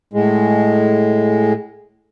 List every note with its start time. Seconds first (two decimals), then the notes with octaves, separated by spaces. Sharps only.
0.13 A2 G#3